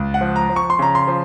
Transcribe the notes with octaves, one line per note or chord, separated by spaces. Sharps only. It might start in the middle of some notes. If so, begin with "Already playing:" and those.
Already playing: C#2
F#5
F3
A#5
F3
C#6
C6
C#3 A#5
C6
F3